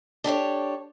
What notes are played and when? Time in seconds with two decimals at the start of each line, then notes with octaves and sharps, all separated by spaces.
0.24 D4 G4 A4 C#5